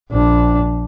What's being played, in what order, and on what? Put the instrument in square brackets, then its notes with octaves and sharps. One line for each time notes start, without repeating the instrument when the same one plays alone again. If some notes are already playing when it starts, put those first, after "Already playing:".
[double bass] A#1 D4